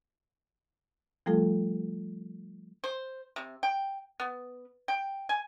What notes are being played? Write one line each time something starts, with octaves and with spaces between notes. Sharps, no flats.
F3 G3 A3 F4 A4
C5
C3
G5
B3
G5
G#5